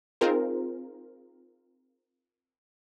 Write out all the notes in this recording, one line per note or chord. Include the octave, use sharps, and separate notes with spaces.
C4 D#4 F4 G#4 A#4 C5